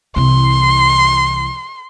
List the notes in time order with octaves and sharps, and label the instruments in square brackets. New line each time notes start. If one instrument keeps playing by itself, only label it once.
[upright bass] C2 E3 [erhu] C6